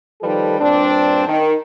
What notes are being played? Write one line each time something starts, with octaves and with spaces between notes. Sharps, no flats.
D#3 F3 G3 A4 B4
G2 A#2 C4 D4
D#3